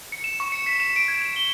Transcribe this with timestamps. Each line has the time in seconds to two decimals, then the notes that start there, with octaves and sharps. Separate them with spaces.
0.12 C#7
0.24 E7
0.40 C#6
0.52 C#7
0.66 B6
0.80 E7
0.96 D7
1.08 G#6
1.22 E7
1.36 G7